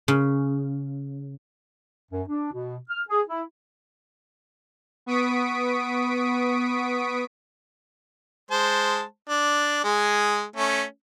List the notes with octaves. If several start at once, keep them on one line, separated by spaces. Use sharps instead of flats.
C#3
F#2
D4
B2
F6
G#4
E4
B3 C#6 D#6 B6 D7
G#3 C5 A5
D4
G#3 G#4
A3 C#4